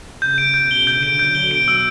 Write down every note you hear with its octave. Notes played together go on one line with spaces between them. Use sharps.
C#3 G6
D7
B2 G6
G7
D3 G6
D7
D3 F#3 G6
G7
B2 D7
E6